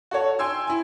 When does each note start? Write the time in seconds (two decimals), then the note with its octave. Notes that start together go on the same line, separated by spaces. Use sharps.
0.11 F#4 A4 C#5
0.39 G5 G#5 C6 E6 G#6
0.67 E4 G#5